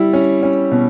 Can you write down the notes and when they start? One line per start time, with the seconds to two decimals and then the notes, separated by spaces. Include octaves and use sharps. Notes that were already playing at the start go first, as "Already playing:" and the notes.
Already playing: G3 E4
0.13 C#4
0.43 C#4
0.71 B2